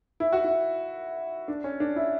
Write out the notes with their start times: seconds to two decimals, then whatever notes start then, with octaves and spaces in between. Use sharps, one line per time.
0.20 E4
0.33 F#4
0.44 E4
1.48 D4
1.64 C#4
1.80 D4
1.96 E4